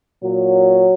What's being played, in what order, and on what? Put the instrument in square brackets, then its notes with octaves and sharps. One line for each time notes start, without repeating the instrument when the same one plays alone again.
[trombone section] A#2 F#3